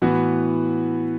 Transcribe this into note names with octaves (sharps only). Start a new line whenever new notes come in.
A2 E3 B3 F#4